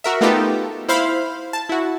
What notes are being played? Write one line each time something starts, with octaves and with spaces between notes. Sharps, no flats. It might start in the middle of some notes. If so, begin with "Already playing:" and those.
F#4 A#4 E5
A3 B3 D#4 F4 G4 A4
E4 C5 F5 B5
A5
E4 F#4